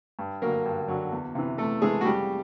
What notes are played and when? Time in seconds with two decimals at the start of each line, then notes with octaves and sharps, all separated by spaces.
0.19 G2
0.42 D3 F#3 A#3 A#4
0.66 G2
0.88 D3 F#3
1.12 E2
1.35 C3 E3
1.58 E2 A3 A4
1.82 C3 E3 G#3 G#4
2.01 F#4
2.05 F2 G3 G4